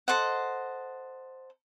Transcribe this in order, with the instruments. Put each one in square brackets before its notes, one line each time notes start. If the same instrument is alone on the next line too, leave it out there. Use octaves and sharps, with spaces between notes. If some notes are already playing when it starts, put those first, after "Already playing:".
[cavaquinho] A4 C5 D#5 F#5